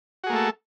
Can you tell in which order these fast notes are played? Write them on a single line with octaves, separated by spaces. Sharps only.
F#4 G#4 A#3 A3 A4